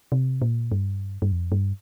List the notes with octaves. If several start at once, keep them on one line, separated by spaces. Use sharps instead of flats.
C3
A#2
G2
G2
F2
G2